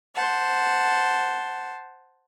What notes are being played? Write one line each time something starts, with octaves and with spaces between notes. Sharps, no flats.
C5 F#5 A5